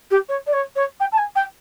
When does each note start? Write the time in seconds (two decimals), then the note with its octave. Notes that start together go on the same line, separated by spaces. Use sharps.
0.10 G4
0.28 C#5
0.46 D5
0.52 C#5
0.75 C#5
0.99 G5
1.12 A5
1.17 G#5
1.35 G5